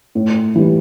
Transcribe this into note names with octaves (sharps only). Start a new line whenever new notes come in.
A2
E3 G3